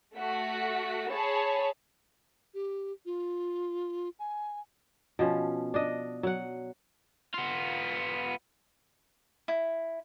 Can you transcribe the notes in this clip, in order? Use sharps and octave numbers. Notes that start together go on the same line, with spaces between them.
A3 F#4 B6
G#4 C#5 A5 B5
G4
F4
G#5
B2 F3 C#4
D4 D#5
F#3 F#5
B3 F4
E4